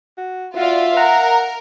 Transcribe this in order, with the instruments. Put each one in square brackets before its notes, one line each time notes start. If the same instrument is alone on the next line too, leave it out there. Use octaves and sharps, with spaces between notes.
[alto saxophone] F#4
[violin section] F4 D5 [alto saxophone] F#4 [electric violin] E5 F5
[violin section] A#4 [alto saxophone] F#5 [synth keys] A#5